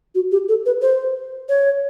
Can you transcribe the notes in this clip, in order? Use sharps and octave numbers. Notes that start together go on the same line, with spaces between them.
F#4
G4
A4
B4
C5
C#5